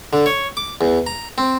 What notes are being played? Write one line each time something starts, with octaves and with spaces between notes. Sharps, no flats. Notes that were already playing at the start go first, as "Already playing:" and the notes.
D3
C#5
D6
E2
A#5
C4